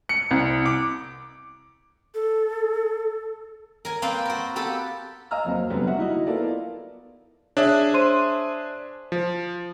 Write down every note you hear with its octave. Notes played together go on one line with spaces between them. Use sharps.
C#7
C2
D6
A4
A#4 G#5
A#3 C4 B4 D5 F5 G5
F#4 A#4
B3 G4 A4 B4
D#5 F5 G#5 A#5 E6 F6
F2 F#3 A#3 C4
D3 F#3 G3 B3
F#4 E5 F#5
D#4 E4 F#4 D#5
B3 E4 F4 A4 A#4 D5
D4 G#4 C#5 E5
C5 C6 D#7
F3